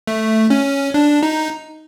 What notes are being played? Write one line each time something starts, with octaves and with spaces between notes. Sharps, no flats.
A3
C#4
D4
D#4